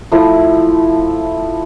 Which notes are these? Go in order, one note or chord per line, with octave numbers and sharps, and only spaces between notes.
F3 A3 E4